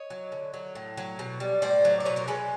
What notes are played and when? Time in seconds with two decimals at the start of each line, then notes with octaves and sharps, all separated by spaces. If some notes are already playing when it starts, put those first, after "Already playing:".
Already playing: C#5 D#5
0.10 F#3
0.32 D3
0.53 F#3
0.75 A2
0.97 F#3
1.19 B2
1.40 G3
1.62 A2 C5 D5
1.85 F#3
2.00 D5
2.05 B2 B4 C#5
2.16 A#4 C5
2.27 G#3 A4 B4